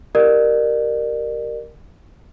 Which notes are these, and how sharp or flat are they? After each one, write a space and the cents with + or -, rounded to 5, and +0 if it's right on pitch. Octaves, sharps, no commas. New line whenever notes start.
G4 +0 A#4 +0 D5 +40